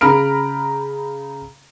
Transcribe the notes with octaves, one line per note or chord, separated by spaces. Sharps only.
C#3 A#5 B5 F6 D7